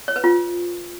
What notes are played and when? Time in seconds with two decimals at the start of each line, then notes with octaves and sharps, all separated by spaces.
0.08 C#5
0.16 B4
0.24 F4